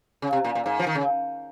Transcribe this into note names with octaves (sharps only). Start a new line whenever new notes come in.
C#3
C3
A#2
A#2
G#2
F3
D#3
C#3